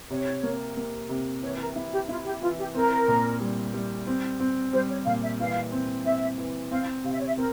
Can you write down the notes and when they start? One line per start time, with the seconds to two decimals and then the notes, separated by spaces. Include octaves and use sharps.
0.10 C3 C#5
0.43 A#3
0.77 A#3
1.09 C3
1.42 E3 C#5
1.60 A#4
1.76 E4
1.92 G4
2.09 E4 F4
2.25 G4
2.41 E3 F4
2.58 G4
2.74 C4 A#4
3.08 A#2
3.40 G3
3.74 G3
4.07 C4
4.40 C4
4.73 G3 C5
4.89 C#5
5.06 A#2 F5
5.23 E5
5.39 E3 F5
5.72 C4
6.05 C4 E5
6.38 E3
6.71 C4 F5
7.04 C3 F5
7.13 E5
7.19 C#5
7.27 E5
7.37 C4 A#4